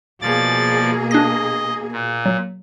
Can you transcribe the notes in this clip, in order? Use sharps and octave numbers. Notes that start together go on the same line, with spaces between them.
B2 F3 A#3 G#4 D5 A6
D4 D#5 A#6
A#2
F#3